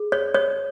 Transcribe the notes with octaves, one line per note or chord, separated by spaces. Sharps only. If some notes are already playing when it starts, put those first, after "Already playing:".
Already playing: G#4
C#5
C#5